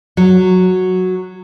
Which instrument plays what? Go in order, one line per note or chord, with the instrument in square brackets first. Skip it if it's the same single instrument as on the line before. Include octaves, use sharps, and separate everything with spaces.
[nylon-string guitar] F#3